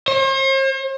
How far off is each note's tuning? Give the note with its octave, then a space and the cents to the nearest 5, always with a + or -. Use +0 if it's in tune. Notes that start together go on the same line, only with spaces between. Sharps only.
C5 +45